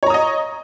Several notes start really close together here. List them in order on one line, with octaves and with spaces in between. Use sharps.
C#5 A#5 D#6 D#5